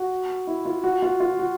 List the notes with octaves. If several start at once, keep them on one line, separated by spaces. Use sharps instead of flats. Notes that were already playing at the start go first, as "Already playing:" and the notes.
Already playing: F#4
E4
F4
F#4
F4
F4
F#4